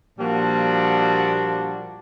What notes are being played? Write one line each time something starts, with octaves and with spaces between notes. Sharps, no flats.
A#2 F3 G3 A#3 D4 F#4